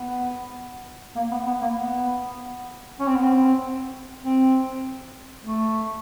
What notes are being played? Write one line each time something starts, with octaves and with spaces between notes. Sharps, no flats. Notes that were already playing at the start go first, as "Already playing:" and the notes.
Already playing: B3
A#3
B3
B3
A#3
B3
C#4
C4
B3
C4
C4
A3